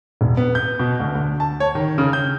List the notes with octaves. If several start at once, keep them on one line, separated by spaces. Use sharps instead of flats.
E1
B3
G6
B2
D2
D2
A5
C#5
D#3
C#3
G6